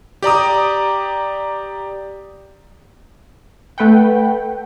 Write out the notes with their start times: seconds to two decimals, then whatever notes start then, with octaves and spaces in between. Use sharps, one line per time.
0.22 G4 D5 A#5 D#6
3.78 A3 B4 F#5 G5